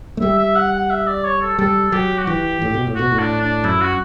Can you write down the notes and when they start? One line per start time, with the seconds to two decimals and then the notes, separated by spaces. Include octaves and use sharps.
0.17 A3
0.21 G3 E5
0.39 E5
0.55 F#5
0.73 F#5
0.90 E5
1.07 D5
1.24 C#5
1.41 A4
1.59 G3 A4
1.92 F#3 G4
2.18 F#4
2.27 E3 G4
2.62 A2
2.74 B2
2.87 A2
2.95 B2 F#4
3.12 A2
3.19 D4
3.42 D4
3.64 F#2 E4
3.81 F#4